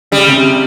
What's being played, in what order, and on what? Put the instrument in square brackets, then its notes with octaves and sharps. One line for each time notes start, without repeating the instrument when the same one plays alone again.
[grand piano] C#3 [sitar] G3
[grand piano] C3